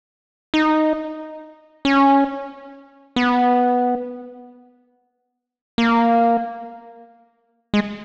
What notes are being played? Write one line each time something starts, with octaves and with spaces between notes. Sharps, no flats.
D#4
C#4
B3
A#3
G#3